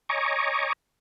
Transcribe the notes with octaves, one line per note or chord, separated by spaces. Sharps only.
C#5 D#5 G#5 A#5 C#6 D6